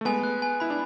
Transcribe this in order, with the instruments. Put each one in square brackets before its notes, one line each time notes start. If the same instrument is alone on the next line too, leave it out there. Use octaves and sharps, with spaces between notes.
[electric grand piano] A3
[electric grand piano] G#3 B3 [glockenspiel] G#5
[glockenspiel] F#6
G#5
[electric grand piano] E4 [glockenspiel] B5
[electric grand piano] D4